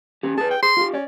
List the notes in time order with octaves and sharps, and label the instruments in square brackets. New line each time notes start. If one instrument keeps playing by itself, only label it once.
[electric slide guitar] C#4 G4
[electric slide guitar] G#4 B4 [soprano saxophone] A5
[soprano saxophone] G5
[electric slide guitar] G#4 [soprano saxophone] C6
[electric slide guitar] F4 G4
[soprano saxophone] C#4 [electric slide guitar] D5